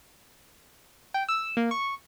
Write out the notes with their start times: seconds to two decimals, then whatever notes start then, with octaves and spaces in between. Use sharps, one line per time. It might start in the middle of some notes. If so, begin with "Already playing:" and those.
1.14 G5
1.29 E6
1.57 A#3
1.71 C#6